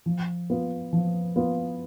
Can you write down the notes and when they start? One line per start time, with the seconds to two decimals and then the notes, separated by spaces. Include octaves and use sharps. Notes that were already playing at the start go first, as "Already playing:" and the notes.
0.06 F3
0.50 B3 F4
0.93 F3
1.36 B3 F4